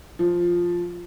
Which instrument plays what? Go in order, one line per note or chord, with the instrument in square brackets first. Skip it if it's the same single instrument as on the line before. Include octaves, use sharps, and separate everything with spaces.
[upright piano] F3